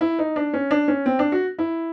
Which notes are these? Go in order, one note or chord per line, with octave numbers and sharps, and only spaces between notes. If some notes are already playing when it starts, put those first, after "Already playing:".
E4
D#4
D4
C#4
D4
C#4
C4
D4
F#4
E4